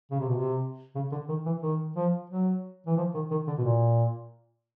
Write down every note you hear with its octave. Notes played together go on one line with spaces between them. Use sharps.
C#3
C3
B2
C3
C#3
D3
D#3
E3
D#3
F3
F#3
E3
F3
D#3
D#3
D3
B2
A#2